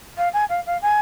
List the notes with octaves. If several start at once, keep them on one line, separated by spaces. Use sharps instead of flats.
F5
G#5
F5
F5
G#5